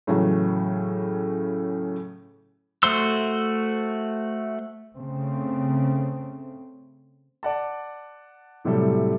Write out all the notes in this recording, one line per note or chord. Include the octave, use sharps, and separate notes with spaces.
A2 C#3 E3 F#3 A3
A3 F#4 C5 C6 E6
C#3 A3 C4
D5 F#5 A5
A2 C3 F#3 G3 A4